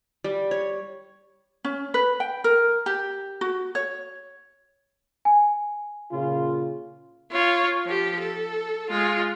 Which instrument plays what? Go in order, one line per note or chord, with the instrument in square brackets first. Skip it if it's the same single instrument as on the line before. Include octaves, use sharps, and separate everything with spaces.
[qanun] G3
C#5
[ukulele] C#4
B4
G5
A#4
G4
F#4
C#5
[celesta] G#5
[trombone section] A#2 C#3 F4
[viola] F4 C#5
F3 G4
A4
G#3 F4